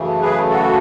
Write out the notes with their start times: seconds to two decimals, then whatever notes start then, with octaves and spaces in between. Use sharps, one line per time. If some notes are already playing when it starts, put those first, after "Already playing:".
Already playing: F#2 C#3 E3 A3
0.21 G#4 B4
0.48 F#4 A4